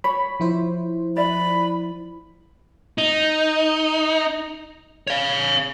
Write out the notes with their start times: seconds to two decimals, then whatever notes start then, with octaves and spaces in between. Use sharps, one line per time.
0.04 C#5 B5
0.40 F3 E4 C5
1.17 D5 E5 B5
2.98 D#4
5.07 C#5 F5